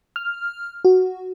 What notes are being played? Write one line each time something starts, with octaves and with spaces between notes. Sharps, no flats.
F6
F#4